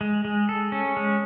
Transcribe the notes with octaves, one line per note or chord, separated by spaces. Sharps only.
G#3
G#3
A4
C#4
G#3